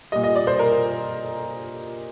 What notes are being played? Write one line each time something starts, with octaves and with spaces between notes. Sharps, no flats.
A#2 G3 D#5
D#5
D5
C5
A#4